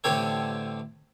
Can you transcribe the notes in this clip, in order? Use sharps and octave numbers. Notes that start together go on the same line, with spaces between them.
A1 D3 C4 G4 A4 C#5